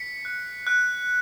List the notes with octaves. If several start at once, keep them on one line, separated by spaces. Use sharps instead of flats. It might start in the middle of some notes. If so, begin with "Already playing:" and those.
Already playing: B6 C#7
F#6
F#6